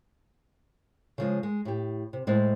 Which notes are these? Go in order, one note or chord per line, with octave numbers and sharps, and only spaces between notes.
C#3 F3 G#3
G#3
A2 G4
C3
A2 G#3 C5 D5